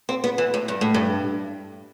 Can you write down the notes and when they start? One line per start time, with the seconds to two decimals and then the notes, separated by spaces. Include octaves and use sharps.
0.09 C4
0.24 B3
0.38 E3
0.54 A2
0.68 G2
0.81 A2
0.94 G2